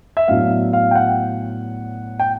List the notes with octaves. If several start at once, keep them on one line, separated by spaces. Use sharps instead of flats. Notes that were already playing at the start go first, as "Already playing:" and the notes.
E5
A2 F#3 B3 D4 F5
F5
G5
F#5
G5